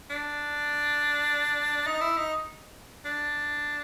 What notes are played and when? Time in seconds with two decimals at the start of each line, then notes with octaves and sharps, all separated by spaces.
0.10 D4
1.87 D#4
2.01 E4
2.17 D#4
3.05 D4